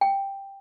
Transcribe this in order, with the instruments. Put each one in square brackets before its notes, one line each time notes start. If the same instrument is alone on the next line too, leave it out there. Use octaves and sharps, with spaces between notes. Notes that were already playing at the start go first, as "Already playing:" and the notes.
[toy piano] G5